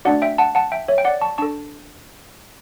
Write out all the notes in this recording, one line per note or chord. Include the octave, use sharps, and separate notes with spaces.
A3 D4 F#4 D5 F#5
E5 G5
F#5 A5
F#5 A5
E5 G5
C#5 E5
G5
D5 F#5
A5 C#6
D4 A4 A5 C#6